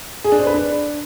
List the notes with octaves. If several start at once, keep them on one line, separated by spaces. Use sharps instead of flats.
G#4
D4
C5
B4
D4